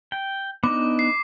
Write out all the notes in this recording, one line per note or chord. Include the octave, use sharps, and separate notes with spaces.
G5
B3 D4 D#4 D6
C7